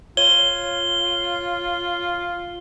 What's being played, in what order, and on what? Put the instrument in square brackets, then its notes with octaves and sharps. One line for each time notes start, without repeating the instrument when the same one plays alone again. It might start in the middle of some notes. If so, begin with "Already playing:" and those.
[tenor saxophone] F4 [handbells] C#5 [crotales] G7